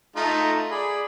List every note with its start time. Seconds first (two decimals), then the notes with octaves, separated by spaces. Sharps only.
0.16 A3 D#4 F4 A#5
0.71 G#4 D5 B5